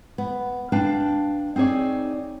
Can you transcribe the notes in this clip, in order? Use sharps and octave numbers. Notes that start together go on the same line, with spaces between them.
B3
D4 B4 F5 G5 A5
C4 D#4 G#4 C#5 D5